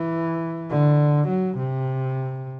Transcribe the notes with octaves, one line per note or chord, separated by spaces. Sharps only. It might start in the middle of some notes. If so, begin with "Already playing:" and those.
Already playing: E3
D3
F#3
C3